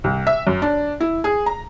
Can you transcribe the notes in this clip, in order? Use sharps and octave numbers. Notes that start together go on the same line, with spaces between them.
C2
E5
F#2
D4
E4
G#4
A#5